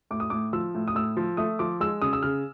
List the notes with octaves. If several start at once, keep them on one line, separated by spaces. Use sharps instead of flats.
A2 D6
D#6
A2 D6
F3 E6
A2
D#6
A2 E6
F3
A3 D#6
F3 D6
G#3 E6
C#3 D#6
E6
C#3 F6